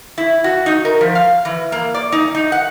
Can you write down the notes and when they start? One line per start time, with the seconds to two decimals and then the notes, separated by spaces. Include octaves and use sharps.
0.18 E4
0.44 F#4
0.66 D#4
0.85 A#4
1.01 F3
1.15 F5
1.45 E3
1.72 A#3
1.95 D5
2.12 D#4
2.35 D#4
2.52 F#5